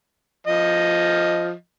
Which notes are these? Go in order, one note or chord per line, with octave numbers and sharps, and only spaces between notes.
F3 D#5